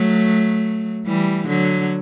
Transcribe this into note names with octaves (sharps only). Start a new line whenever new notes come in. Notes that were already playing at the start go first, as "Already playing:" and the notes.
Already playing: F#3 A3
E3 G3
D3 F#3